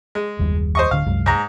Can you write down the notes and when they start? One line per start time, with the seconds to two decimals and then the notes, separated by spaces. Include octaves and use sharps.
0.15 G#3
0.39 F#1 D#2 G3
0.75 C5 D#5 C#6
0.91 D1 D3 F5
1.06 C2 F#2 G#3
1.26 G#2 A#5